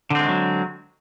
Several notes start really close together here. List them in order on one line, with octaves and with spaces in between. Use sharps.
D3 C4 G#3 D#3 F#3